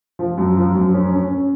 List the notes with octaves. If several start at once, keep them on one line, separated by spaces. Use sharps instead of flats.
F3
F#2
F3
F#2
C#4
C#4
C#4